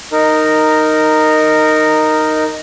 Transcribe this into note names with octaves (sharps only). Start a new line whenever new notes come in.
D#4 A#4